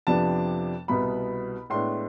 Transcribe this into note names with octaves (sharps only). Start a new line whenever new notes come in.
F2 C3 F3 B3 D4 A5
C2 B2 B3 B5
A2 G#3 B3 D4 C6